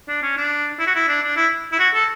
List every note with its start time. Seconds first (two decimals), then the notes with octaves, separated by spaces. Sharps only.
0.08 D4
0.22 C#4
0.37 D4
0.79 E4
0.87 F#4
0.95 E4
1.08 D4
1.23 D4
1.36 E4
1.72 E4
1.79 F#4
1.94 A4